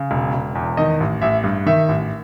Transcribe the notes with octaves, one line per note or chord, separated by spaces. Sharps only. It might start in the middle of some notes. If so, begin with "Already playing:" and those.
Already playing: C#3
E1
E1
E2
D#3 D#5
A1
A1 E5
G2
D#3 E5
A1